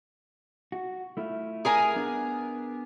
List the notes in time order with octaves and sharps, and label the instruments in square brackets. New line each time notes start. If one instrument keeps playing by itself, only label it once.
[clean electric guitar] F#4
A3 E4 F4
[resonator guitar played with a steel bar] G#4 A#4 G#5
[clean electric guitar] B3 D4